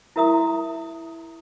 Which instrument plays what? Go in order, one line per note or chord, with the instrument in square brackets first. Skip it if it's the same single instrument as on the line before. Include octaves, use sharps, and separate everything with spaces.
[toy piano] E4 F#4 A#4 E5 A#5 D#6